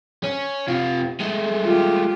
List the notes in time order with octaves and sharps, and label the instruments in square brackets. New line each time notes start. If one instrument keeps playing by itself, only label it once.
[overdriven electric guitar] C#4
C3 F4
G#3 A3
[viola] F4 G4